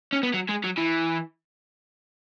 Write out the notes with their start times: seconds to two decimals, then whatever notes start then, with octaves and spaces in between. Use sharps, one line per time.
0.13 C#4
0.23 B3
0.34 F#3
0.49 G#3
0.64 F#3
0.77 E3